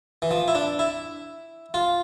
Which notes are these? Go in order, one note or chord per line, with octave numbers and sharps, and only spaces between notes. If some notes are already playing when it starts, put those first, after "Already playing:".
E3
F3
E4
D4
E4
F4